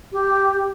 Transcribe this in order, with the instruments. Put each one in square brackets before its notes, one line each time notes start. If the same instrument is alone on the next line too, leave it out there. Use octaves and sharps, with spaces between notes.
[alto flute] G4